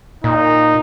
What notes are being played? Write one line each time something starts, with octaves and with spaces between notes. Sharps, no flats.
A#2 D#4